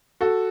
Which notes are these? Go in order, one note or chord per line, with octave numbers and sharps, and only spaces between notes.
F#4 A4